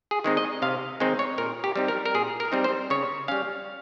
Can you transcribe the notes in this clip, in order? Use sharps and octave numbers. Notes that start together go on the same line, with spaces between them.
G#4
D#3 G#3 C4 D#4
D#5
C3 F5
D#3 G#3 C4 D#4
C#5
A#2 A#4
G4
G3 C4 D#4
A#4
A#4
A#2 G#4
A#4
G3 C4 D#4
C5
C#3 C#5
G3 C#4 F5